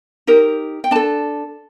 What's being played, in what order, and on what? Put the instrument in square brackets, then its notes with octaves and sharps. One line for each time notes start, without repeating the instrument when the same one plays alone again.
[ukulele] D#4 G4 A#4
G5
D4 A4 A5